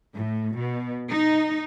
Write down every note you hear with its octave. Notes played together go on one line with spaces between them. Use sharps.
A2
B2
D#4